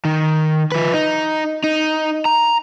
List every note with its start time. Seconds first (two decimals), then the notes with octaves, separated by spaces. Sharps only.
0.05 D#3
0.72 F3 B4
0.94 D#4
1.64 D#4
2.25 A#5